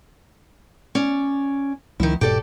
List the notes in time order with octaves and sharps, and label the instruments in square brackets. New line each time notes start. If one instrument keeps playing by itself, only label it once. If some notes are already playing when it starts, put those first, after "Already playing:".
[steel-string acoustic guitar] C#4 D5
[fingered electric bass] C#2 F3 [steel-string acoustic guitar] D#3 E4
[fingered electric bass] E1 G#2 B2 [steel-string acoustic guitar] G4 A4 D5